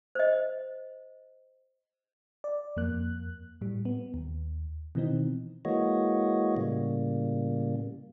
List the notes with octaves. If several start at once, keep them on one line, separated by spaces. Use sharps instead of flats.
C5 D#5
D5
F2 A#3 F#6
A2 G3
B3
D#2
B2 D#3 E3 C4 D#4
E3 G#3 A#3 F#4 C#5 D#5
A2 C#3 G3 A#3